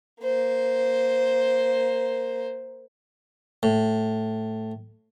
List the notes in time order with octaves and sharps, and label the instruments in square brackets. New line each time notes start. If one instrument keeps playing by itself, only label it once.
[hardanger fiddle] A#3 C5
[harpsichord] A2